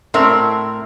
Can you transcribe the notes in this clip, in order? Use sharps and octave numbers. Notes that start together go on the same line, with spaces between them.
A2 C4 A#4 E5